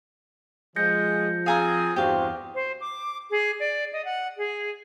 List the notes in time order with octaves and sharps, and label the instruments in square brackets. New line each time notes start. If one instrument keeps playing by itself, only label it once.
[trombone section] F3 [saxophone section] G#3 [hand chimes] G6 A#6 C#7
[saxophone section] C4 F4 G#4 [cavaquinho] F5 G#5 A#5
[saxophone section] E2 G2 [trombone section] C4 F#4 [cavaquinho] G4 F5
[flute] C5
D6
G#4
D5
D#5
F#5
G#4